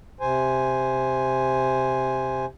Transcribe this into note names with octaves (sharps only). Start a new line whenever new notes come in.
C3 C5 G#5